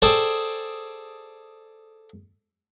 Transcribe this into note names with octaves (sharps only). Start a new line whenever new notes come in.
G#4 A4 C5 D5 G5